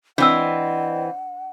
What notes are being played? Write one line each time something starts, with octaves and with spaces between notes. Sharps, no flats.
E3 C4 D4 C5 D5 D#5 F#5 E6